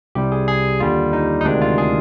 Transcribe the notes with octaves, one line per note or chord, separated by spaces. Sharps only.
C2 C3 G3 G4
G#4
G#4
D#2 D3 G3 F4
D#4
D#4
D2 C3 D#3 G#3 D4
F4
G#4